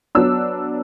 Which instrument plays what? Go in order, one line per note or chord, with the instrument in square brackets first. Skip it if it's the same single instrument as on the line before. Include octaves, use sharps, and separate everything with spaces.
[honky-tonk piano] F#3 B3 D4 E6